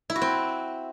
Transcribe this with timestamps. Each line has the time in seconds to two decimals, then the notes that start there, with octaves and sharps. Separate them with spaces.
0.10 E4
0.16 F#4
0.22 C4